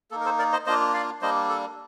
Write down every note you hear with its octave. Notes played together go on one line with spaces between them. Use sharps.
A#3 D#4 A4
A#4
A4 C5
A#4 D5
C5 D#5
A#3 D4 F4 C5 D#5
D5 F5
G3 A#3 D4 C5 D#5
A4